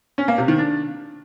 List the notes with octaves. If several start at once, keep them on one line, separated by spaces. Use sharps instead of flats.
C#4
A#3
C3
D#3
D4